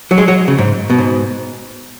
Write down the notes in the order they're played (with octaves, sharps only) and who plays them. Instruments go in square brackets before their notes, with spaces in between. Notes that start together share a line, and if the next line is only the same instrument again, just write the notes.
[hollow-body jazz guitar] F#3
G#3
F#3
C#3
G#2
B2
G#2